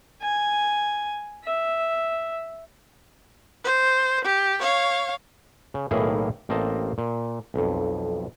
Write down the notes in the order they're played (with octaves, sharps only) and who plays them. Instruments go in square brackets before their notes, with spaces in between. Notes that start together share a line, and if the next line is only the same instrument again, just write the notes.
[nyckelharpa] G#5
E5
[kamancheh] C5
G4
C#5 F5
[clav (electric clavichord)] C#3
B1 A2 D#3 A#3 E4 G#4
A1 A#3 C4 D#5 A5
A#2
B1 F2